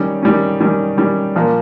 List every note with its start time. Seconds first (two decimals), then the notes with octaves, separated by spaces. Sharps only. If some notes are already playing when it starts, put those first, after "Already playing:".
Already playing: D#3 G3 C#4
0.23 D#3 G3 C#4
0.60 D#3 G3 C#4
0.97 D#3 G3 C#4
1.36 A#2 F3 A#3